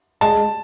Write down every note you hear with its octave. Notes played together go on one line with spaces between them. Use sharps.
G#3 A5